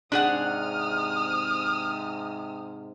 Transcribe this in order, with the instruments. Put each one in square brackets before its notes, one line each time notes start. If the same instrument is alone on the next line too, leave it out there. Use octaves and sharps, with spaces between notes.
[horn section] G#2 C3 [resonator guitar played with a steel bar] D4 G#4 F#5 [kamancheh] D#6 F6